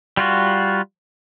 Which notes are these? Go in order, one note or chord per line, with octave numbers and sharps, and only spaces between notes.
G3 F4 F#4